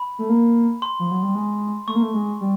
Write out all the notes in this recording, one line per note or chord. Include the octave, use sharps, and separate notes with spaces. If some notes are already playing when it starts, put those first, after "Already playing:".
Already playing: B5
A3
A#3
C6
F3
F#3
G3
G#3
A3 C#6
A#3
A3
G#3
G3